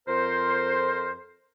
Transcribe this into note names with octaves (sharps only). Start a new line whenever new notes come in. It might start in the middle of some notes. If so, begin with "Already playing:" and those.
F2 A#4 C5